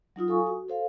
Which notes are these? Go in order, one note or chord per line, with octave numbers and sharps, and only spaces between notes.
F#3 D#4 F4 D#6
A4 F5 G#5 C#6 D#6
F#4
A4 C5 F5